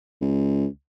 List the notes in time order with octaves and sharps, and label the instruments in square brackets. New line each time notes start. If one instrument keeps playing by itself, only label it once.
[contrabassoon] C#2